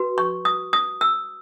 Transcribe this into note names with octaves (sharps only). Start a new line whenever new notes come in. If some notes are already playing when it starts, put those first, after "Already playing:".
Already playing: F#4 B4
C#6
D#6
D#6
E6